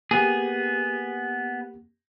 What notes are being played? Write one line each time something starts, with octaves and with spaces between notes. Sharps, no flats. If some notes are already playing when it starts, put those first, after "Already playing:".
A#3 B3 G4 G#4